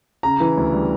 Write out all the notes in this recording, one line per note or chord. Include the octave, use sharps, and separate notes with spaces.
C#3 A#5
E3
D2
G3